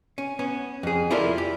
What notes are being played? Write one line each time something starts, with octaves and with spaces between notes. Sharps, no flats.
C#4
B3 C#4
F2 G#4
E4 F4 G4 A4 A#4 D5
G4